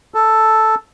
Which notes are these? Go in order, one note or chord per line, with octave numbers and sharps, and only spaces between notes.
A4